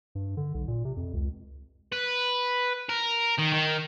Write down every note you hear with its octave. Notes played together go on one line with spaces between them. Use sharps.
G2
D3
B1
A#2
C3
F2
C#2
B4
A#4
D#3
D#3